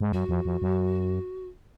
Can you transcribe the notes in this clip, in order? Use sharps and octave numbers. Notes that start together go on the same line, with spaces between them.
G#2
F#2 F#4
F2
F2
F#2